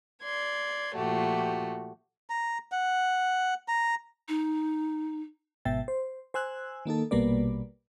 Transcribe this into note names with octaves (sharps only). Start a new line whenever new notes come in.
D5 C6 G#6
A#2 F3 A3 F#4 G4
A#5
F#5
A#5
D#4
G#1 B2 E5 G5 A6
C5
C5 G#5 E6 F#6
D#3 A#3 D#4 A4
A#1 B2 G3 A#3 B4 D5